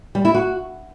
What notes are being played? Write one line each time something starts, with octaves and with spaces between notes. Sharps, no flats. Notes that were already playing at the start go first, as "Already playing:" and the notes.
G3
E4
F#4